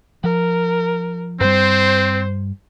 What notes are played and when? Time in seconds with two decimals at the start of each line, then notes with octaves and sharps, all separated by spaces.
0.24 F3 A#4
1.40 G2 G3 C4 C5